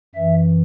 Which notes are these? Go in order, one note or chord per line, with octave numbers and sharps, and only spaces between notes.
F#2 E3 E5